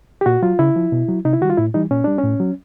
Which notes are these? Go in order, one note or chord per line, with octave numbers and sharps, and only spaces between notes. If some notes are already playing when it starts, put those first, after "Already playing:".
G4
A#2 F#4
F#3 F4
C#3 E4
F3
B2
F#3
C3 D#4
E4
D#3 G3 F4 F#4
A2 E4
E3 G3 D#4
A#2 C#4
G3 D4
C#4
A2
F#3